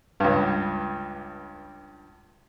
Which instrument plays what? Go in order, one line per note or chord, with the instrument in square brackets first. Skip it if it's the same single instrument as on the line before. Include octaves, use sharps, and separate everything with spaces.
[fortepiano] C#2 G2